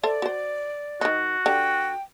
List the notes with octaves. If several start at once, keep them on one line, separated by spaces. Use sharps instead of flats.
A4 C5 D5 E5
F#4 C5
D#3 D#4 F#4
D3 G4 G5